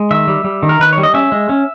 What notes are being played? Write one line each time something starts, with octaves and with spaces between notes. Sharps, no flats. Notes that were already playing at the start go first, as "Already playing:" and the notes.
Already playing: G#3
D#3 E5
G3
G3
D#3
A#4
D#3 B4
C#5
G3
D#5
C#4 E5
G#3
C#4